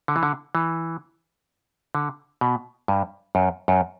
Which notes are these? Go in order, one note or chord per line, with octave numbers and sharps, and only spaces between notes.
D3
E3
D3
E3
D3
B2
G2
F#2
F#2